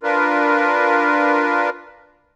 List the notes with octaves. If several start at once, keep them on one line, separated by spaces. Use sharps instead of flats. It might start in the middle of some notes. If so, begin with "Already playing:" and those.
D4 F4 A#4 B4